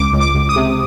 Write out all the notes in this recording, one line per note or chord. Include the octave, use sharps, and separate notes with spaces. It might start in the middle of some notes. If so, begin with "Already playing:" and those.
Already playing: C#2 D6
C#2
D6
C#2
D#6
C3